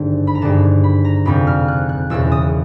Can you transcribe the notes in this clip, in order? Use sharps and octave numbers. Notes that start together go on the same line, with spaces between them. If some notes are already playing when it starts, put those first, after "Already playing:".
Already playing: G#1 G2 D3
B5
A#5
G#1 G2 D3 A5
B5
A#5
F1 F2 D3 B5
F6
F#6
F#6
E1 E2 C#3 E6
D#6